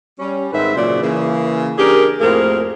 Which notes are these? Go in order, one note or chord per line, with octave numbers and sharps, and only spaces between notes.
G3 C#4
G#2 D#3 C4 B4 C5 E5
A#2 C#3 F#3 C5 D5
C#3 E3 A#3
C#4 D4 G4 G#4 A#4
F2 A2 A#3 G#4 A#4 C5